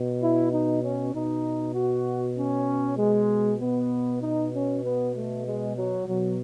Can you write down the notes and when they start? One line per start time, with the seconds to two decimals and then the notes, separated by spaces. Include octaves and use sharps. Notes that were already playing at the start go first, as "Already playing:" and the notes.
Already playing: B2
0.20 E4
0.50 D#4
0.82 C#4
1.12 B2 D#4
1.74 F#4
2.36 C#4
2.97 G#3
3.60 B2 B3
4.20 D#4
4.52 C#4
4.83 B3
5.13 A3
5.44 G#3
5.75 F#3
6.06 B2 F#3